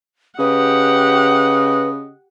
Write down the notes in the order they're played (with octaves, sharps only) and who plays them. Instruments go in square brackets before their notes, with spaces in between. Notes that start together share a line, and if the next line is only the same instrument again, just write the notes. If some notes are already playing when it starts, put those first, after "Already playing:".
[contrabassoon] C#3 [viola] G4 F#5 [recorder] B4 [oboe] D#5